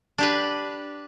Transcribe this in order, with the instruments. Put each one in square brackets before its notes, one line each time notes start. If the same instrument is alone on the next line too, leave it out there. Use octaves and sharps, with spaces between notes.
[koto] D4 G4 B4